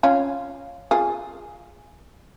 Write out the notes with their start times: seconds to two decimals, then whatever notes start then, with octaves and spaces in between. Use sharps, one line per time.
0.03 C#4 F4
0.91 F4 G#4